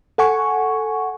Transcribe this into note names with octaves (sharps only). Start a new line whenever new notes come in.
A4 F#5 G#5 C#6